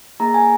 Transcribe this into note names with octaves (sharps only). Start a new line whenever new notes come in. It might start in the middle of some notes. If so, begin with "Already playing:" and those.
A#3 D#4 G#4 A#5
G#5